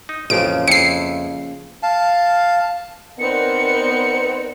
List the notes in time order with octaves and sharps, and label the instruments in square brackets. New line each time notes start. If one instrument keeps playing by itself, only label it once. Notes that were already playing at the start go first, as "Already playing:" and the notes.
[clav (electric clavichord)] D#4
[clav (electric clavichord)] A1 F2 [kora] C#3 F3 A#3 [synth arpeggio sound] D7
[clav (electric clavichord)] F2 E4 [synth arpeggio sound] C7 C#7
[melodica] F5 A5
[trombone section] B3 [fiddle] C4 D#4 [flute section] A#4 B4 D5 [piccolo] C#7